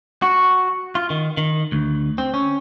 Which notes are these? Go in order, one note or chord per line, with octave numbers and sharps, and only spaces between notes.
F#4
F4
D#3
D#3
D2
C4
C#4